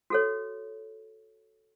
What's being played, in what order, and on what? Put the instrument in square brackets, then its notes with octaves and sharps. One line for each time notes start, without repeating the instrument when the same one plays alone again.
[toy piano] F#4 A4 C#5